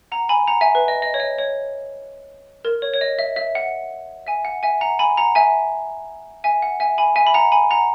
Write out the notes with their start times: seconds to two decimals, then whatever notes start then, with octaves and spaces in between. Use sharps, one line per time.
0.12 F#5 A#5
0.29 G#5 B5
0.48 F#5 A#5
0.61 E5 G#5
0.75 B4
0.88 D#5
1.02 D#5
1.14 C#5
1.20 D#5
1.38 C#5
2.65 A#4
2.82 C#5
2.94 C#5
3.01 D#5
3.19 E5
3.36 E5
3.55 F#5
4.27 E5 G#5
4.45 F#5
4.63 E5 G#5
4.81 F#5 A#5
4.99 G#5 B5
5.17 F#5 A#5
5.35 E5 G#5
6.44 E5 G#5
6.62 F#5
6.80 E5 G#5
6.98 G#5 B5
7.16 E5 G#5
7.27 B5
7.34 F#5 A#5
7.52 G#5 B5
7.71 F#5 A#5